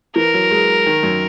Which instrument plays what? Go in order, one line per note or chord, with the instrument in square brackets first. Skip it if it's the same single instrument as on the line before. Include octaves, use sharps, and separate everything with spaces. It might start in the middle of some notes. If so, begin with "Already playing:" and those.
[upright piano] E3 [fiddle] A#4
[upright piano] F#3
G#3
D#3
F#2